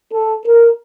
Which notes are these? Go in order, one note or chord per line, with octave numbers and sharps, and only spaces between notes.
A4
A#4